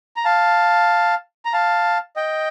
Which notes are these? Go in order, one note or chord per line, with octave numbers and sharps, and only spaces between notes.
A#5
F5 A5
A#5
F5 A5
D#5 G5